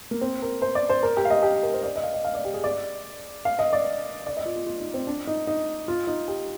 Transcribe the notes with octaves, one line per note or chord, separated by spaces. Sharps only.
A#3
C4
A#4
C5
D5
C5
A#4
G4
F5
D#5
G4
A#4
C5
D5
D#5
F5
D#5
F5
D5
G4
G#4
D5
F5
D#5
D5
D5
D#5
F4
F4
F4
D#4
C4
D4
D#4
D#4
F4
D#4
G4